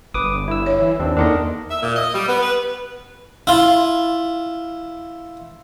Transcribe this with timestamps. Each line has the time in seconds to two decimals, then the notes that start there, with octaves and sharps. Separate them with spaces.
0.14 G1 B4 D6 D#6
0.48 E4 E6
0.66 C#5 E5
0.80 E3
1.00 D#2 C4 D4
1.17 E2 A#3 D4 D#4 A4 A#4 D#5
1.71 E5
1.82 A#2
1.96 D#5
2.14 G3
2.28 B3
2.43 B4
3.47 E4 F4